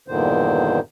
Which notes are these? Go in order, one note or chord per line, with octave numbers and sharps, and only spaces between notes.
E2 G2 A#2 D3 D#3 C5